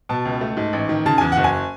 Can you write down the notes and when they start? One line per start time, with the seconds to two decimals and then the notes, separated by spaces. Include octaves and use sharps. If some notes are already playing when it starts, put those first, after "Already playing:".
0.09 B2 A5
0.25 C#2
0.41 A3
0.57 G#2
0.73 A1
0.89 D#3
1.06 C#3 A5
1.18 E2 G#5
1.32 F#5
1.37 F#1
1.44 G#5